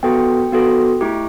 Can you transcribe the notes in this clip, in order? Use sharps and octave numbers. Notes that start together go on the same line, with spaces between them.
B3 F#4 A4 G5
B3 F#4 A4
A3 E4 G4 D6